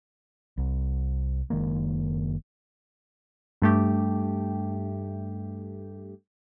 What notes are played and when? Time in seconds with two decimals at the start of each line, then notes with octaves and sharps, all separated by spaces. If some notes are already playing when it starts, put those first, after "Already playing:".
0.58 C2
1.50 F#1 D#3 G#3 A#3
3.62 G2 A3 G4